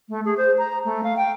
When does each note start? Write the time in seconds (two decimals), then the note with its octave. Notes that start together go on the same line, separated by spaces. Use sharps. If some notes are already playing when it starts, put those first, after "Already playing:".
0.09 A3
0.25 G#4
0.37 C5
0.58 A#5
0.85 A3
1.04 F5
1.17 G5